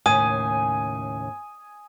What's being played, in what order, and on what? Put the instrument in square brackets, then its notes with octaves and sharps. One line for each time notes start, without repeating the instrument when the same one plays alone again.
[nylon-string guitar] D#2 A2 C#3 [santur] G#5 [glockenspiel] D#6